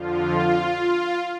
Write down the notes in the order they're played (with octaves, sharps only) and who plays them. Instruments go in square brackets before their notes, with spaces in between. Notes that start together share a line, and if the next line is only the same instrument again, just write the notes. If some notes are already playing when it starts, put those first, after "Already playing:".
Already playing: [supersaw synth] F2 D3 F3 F4